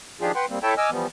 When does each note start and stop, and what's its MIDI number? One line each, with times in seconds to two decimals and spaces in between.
0.21 0.32 51
0.21 0.32 53
0.21 0.32 62
0.21 0.32 65
0.21 0.32 67
0.21 0.32 68
0.35 0.46 71
0.35 0.46 78
0.35 0.46 79
0.35 0.46 84
0.49 0.59 55
0.49 0.59 58
0.49 0.59 60
0.63 0.74 64
0.63 0.74 69
0.63 0.74 73
0.63 0.74 76
0.63 0.74 79
0.63 0.74 81
0.78 0.90 75
0.78 0.90 80
0.78 0.90 86
0.78 0.90 88
0.78 0.90 89
0.91 1.07 52
0.91 1.07 53
0.91 1.07 55
0.91 1.07 59